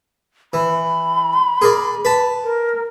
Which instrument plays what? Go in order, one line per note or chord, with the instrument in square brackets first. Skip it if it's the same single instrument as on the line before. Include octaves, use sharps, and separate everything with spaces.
[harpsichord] E3 [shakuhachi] B5
[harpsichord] G#4 A#4 D5
B4 A5
[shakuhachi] A#4